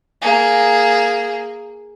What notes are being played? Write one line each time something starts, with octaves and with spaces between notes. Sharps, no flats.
A#3 G#4